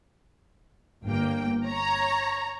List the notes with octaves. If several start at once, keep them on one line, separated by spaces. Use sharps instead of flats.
G1 A#3 G5
C#5 A#5